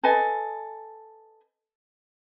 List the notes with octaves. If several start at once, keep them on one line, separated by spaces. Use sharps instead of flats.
A4 B4 D#5 G#5